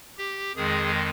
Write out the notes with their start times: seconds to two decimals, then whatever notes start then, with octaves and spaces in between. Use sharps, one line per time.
0.18 G4
0.56 F2 D#3 G#3 G#4